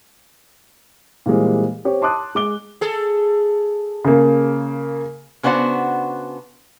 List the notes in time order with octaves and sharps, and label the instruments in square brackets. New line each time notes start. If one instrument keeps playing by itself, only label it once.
[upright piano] A#2 E3 G3 G#3 C4
C4 G4 C#5
A5 C6 D6 D#6 F#6
G#3 D6 G7
[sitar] G#4 A4
[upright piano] C#3 A#3
[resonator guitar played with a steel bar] C#3 B3 D4 F#4 C5 F#5